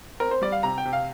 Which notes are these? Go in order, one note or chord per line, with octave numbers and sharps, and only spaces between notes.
C4 A#4
C5
G3 D5
F5
C3 A#5
G5
C3
F5